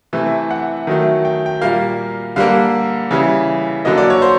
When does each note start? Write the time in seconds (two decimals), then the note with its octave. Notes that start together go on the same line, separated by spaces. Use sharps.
0.13 C3 E3 A3
0.51 F#5
0.87 D#3 F#3 A3
1.25 G5
1.46 G5
1.61 A#2 G3 A#3 F5
2.36 D3 G3 A#3 F5
3.11 C#3 E3 G3
3.85 D3 F#3 A#3 D#5
3.97 D5
4.10 C#5
4.22 C5